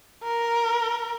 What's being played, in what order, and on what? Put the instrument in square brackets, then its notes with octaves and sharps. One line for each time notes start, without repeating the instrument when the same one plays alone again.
[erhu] A#4